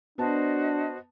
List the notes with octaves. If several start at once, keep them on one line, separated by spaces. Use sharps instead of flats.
B3 D4 F#4 C5 D#5 A5